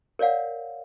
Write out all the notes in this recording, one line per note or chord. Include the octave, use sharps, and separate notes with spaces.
A#4 C#5 D5 F5 F#5